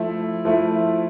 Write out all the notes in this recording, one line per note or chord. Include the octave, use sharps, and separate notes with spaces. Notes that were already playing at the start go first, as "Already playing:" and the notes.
Already playing: F3 A3 E4
F3 A3 E4